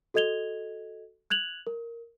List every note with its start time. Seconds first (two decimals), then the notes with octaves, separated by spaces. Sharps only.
0.14 F#4 A4 D#5 G#6 F7 G7
1.30 F#6 G#6 F7 F#7
1.67 A#4